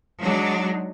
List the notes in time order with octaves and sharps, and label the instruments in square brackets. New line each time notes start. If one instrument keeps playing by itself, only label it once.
[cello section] F#3 G#3 D4 D#4